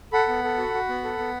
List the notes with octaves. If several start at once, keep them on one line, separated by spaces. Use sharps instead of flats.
A4 F#5 B5
B3
A4
F#4
F#4
B3
A4
B3